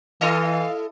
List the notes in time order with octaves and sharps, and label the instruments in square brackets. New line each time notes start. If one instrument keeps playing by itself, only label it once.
[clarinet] E3 [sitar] E4 A4 D#5 [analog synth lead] F5